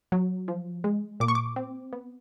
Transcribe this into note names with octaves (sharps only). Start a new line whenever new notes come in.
F#3
F3
G#3
A#2 D6
C#6
D6
C4
B3